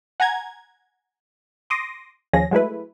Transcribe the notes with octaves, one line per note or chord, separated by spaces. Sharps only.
F#5 G#5 A#5 G#6
C6 D6 D#6 A#6
D#2 F3 C#4 G#4 A#6
F#3 G#3 A3 E4 B4